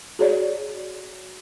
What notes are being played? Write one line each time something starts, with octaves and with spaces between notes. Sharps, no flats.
F#4 G#4 C#5 D5